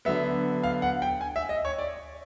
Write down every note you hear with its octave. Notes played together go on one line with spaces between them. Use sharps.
D3 F#3 B3 E5
F5
F#5
G5
G#5
E5
D#5
C#5
D5